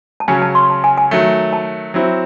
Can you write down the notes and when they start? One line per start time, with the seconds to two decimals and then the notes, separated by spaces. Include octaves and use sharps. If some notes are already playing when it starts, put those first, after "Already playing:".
0.20 A5
0.28 C#3 F#3 C#4 G#5
0.42 A5
0.55 C6
0.70 A5
0.84 G#5
0.98 G#5
1.11 D#3 F#3 A3
1.53 A5
1.94 F#3 C4 E4